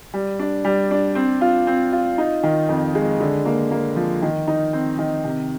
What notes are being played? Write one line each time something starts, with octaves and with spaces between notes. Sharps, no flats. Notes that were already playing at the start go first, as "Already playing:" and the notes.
G3
D4
G3
D4
C4
F4
C4
F4
D#4
D#3
F2
G#3
D3
A#3
A#3
F3
D#3
D#4
C4
D#3
C3